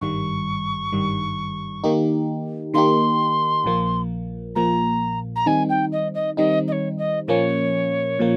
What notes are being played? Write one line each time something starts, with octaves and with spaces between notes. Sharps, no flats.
G#1 G2 D#3 G3 C#6
G#1 G2 D#3 G3
D#3 A#3 D#4 G4
D#3 A#3 D#4 G4 C6
A#1 A#2 F3 A#3
A#1 A#2 F3 A#3 A#5
A#5
D#3 G3 C4 D#4 G#5
G5
D#5
D#5
D#3 G3 C4 D#4 D#5
D#5
C#5
D#5
A#2 F3 A#3 C#4 C#5
A#2 F3 A#3